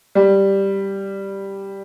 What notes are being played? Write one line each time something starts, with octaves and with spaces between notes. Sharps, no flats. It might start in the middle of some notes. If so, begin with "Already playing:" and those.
G3